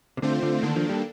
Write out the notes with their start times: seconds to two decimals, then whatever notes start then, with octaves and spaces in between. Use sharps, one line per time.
0.17 C3
0.22 D3 A3 C4 F4 C5
0.43 D3
0.62 D3 D#3 A#3 D4 A4
0.76 F3
0.89 G3